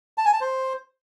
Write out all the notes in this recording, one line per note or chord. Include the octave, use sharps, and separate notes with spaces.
A5
G#5
A5
C5